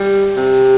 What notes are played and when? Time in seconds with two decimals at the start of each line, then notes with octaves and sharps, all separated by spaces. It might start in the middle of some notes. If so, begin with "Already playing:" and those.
Already playing: G3
0.37 C3